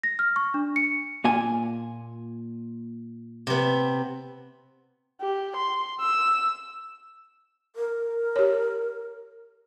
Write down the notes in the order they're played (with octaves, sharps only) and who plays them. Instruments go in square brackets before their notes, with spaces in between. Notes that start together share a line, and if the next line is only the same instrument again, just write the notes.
[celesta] A#6
F6
C#6
D4
C#7
[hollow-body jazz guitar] A#2 F4 G#5
[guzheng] C3 B3
[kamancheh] G4
C6
E6
[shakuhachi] A#4
[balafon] G4 C#5